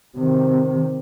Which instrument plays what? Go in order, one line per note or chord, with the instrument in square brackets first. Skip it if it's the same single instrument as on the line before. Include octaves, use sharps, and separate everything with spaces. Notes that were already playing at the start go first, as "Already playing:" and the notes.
[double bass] C3 D#3